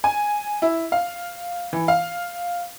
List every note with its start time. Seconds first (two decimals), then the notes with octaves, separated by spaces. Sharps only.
0.04 G#5
0.62 E4
0.92 F5
1.73 E3
1.88 F5